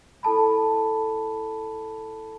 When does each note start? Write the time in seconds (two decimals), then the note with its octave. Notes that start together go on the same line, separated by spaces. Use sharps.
0.23 E4 A4 A5 B5